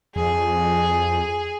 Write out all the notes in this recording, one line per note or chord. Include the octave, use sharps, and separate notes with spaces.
F2 G#4